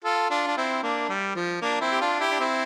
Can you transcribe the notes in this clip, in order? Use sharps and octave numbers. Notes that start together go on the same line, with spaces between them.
F4 A4
D4 F4
D4
C4 E4
A#3 D4
G3
F3
A#3 D4
C4 E4
G4
D4 F4
E4 G4
D4
C4 E4